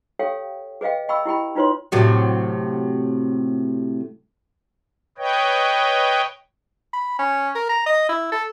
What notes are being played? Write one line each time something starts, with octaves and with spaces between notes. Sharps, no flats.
G4 A4 C#5 F5 G5
G#4 B4 D#5 F5 G5
D#5 G5 B5 C#6 E6
E4 G4 G5 B5
D#4 F4 B4 C#5 C6
A2 C3 F#3
B4 C#5 D#5 G5
B5
C#4
A#4
A#5
D#5
E4
A4